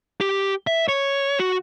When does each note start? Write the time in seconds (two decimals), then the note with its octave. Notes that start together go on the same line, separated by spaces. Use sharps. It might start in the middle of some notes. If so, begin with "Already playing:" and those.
0.21 G4
0.67 E5
0.88 C#5
1.39 F#4